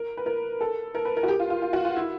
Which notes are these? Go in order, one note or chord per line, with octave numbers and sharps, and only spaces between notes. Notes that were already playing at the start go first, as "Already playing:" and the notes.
Already playing: A#4
B4
A#4
A4
A#4
B4
A#4
F#4
G4
F4
F4
F4
F#4
F4
E4